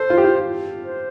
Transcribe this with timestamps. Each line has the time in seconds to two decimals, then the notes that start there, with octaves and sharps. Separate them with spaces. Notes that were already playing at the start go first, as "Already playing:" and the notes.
Already playing: A4 C5
0.10 F4
0.18 G4
0.24 F4
0.85 C5